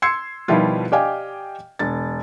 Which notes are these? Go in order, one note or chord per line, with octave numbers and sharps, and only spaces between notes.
C6 E6 G#6 C7 C#7
B2 D#3 F3 G3 E4 F4
G4 D5 D#5 F5 G5 G#5
E1 A6